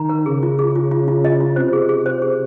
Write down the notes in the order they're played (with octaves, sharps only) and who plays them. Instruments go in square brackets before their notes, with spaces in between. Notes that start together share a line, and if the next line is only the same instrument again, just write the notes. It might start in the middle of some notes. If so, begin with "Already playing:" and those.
Already playing: [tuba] D#3 [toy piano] A#5
[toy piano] A#4
[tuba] C#3 [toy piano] G#4
[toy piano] F4
G#4
F4
F4
F4
D#5
F4
[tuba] C3 [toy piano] C5
[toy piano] G#4
G#4
C5
G#4